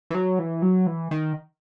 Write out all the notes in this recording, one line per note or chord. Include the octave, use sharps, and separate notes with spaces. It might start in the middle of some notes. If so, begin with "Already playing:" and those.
E3
F#3
E3
F#3
E3
D#3